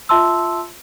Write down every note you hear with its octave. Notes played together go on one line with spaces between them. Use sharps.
F4 E5 A5 C6 E6